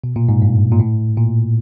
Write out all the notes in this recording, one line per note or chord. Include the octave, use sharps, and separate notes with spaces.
B2
A#2
G#2
G2
A#2
A2
A#2